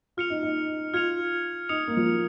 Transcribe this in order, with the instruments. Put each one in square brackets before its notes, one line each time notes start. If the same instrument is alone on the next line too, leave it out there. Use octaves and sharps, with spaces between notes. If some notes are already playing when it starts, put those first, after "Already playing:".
[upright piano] F4 [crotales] F6 C#7 F7
[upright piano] D#4
D#4
[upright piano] F4 [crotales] F6 G#6 C#7 F7
[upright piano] D#4 [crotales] D#6 C#7 F7
[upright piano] A#3
F3